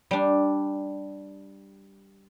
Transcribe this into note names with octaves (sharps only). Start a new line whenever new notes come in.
G3 D4